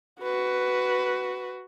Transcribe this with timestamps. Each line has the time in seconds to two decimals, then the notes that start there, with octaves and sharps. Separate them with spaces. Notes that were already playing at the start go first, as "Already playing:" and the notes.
0.21 F#4 B4